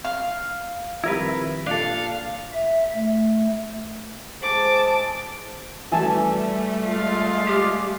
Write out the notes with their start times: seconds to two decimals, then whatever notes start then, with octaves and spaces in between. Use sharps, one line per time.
0.05 F5
1.04 F2 D#3 G3 E4 A#4 B4
1.67 A#2 D4 A4 F5
2.53 E5
2.94 A3
4.42 G#3 G#4 C5 A5 D6
5.92 E3 G3 A3 G#5 A5
6.82 G#3 F4 F5
7.47 G4